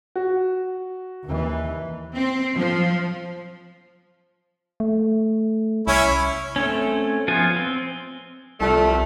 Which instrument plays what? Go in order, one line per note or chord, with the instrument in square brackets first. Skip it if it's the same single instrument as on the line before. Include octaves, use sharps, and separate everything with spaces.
[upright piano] F#4
[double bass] D#2 E3
[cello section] C4
F3
[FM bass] A3
[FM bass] C2 [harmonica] C#4 E4 C#5
[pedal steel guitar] A3 C4 C#4
F3 B3 F4 G#5
C4
[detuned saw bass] C2 [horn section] F3 G3 A3